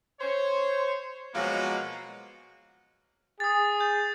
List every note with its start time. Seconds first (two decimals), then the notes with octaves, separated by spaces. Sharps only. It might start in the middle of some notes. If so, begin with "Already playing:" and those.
0.21 C5 C#5
1.35 B2 F3 F#3 G#3 A#3 F#4
3.40 G#4 D#6 A6
3.80 G6